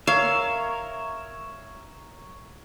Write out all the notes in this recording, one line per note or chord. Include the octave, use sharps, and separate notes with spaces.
A#4 C#5 E5 F5